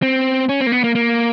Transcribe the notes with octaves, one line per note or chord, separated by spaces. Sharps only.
C4
C#4
C4
A#3
B3
A#3
A#3